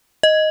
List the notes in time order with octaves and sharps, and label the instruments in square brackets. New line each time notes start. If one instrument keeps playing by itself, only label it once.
[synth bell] D#5